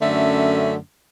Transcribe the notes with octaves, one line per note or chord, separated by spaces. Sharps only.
F#2 D3 A3 C#4 E5